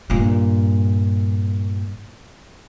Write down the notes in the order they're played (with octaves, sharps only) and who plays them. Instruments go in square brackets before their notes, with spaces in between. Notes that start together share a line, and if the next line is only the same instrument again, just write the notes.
[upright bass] G2 A#2